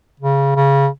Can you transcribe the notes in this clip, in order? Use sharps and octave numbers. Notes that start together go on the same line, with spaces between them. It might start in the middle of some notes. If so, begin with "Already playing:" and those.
C#3
C#3